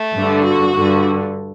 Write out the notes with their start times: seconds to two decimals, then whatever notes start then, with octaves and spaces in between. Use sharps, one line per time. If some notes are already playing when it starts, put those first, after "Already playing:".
Already playing: A3
0.15 G2 D3
0.45 F#4
0.74 G2 D3